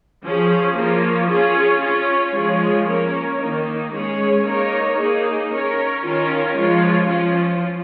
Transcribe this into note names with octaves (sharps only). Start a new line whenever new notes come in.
F3 C#4 G#4
F3 A#3 F4 C#5
C#4 F4 G#4 C#5
C#4 F4 C#5
F3 G#3 F4 G#4 C#5
A#3 C#4 A#4 C#5
D#3 A#3 D#4
G#3 C#4 G#4 C#5
A#3 D#4 A#4 C#5
A#3 D#4 G#4
C#4 A#4 C#5
D#3 C#4 F4 A#4 C#5
F3 G#3 F4 C#5
F3 C#4 F4